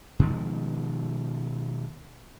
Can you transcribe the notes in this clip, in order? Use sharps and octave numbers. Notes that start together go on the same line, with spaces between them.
B2 D#3 F3 G#3